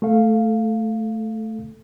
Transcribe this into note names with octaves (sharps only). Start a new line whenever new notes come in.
A3 A4 F5